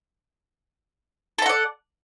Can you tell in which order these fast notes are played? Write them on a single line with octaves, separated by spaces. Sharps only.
A4 A#5 F#5 D5